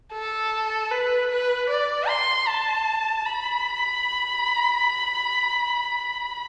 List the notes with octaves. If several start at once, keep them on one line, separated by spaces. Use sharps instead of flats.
A4
B4
B4
D5
C6
A5
B5